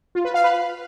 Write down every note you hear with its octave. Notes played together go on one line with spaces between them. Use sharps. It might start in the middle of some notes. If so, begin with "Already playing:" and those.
F4
B4
F5
B4